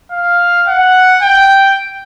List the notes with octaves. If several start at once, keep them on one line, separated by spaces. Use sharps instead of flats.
F5
F#5
G5